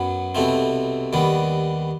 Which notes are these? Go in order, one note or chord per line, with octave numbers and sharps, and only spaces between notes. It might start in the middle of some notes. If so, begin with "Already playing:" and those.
Already playing: F#2 F#3 B3
C2 B2 A3 C4
D#2 D#3 G3 B3